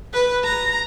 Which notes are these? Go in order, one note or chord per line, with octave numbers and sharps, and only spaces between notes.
B4
A#5